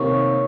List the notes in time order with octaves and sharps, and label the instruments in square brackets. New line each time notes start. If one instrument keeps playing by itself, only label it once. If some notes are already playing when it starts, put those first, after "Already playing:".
Already playing: [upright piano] C3 D#3 A#3 D#4 [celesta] C#5 C#6